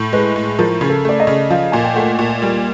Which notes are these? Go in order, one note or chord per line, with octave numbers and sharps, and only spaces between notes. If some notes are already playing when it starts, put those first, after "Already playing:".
Already playing: A2 A4
G#3 B4
A2
F3 A#4
C#3
A4
A3 D5
D#5
C#3
F3 F5
A#2 G#5
G5
A3 F#5
A#2
G3